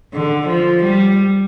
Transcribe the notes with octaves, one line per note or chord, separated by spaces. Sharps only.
D3
F3
G3